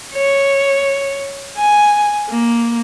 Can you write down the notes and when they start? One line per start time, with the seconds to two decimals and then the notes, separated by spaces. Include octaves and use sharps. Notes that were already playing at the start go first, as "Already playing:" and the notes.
0.14 C#5
1.57 G#5
2.29 A#3